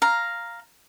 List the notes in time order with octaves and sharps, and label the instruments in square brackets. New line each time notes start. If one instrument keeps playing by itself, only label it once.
[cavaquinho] F5 A#5